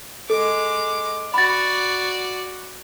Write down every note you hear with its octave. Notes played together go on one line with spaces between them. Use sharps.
G#3 A4 D6
F#4 D5 B5 A6